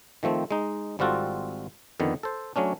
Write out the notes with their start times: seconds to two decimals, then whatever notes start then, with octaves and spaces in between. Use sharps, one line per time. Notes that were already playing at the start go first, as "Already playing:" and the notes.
0.23 D#3 F3 A3 C4
0.51 G#3 D#4
0.99 G#1 G3 C4 F4 F#4 A4
2.00 F2 D3 D#3 B3
2.23 A4 C5
2.56 F#3 A3 C#4 D4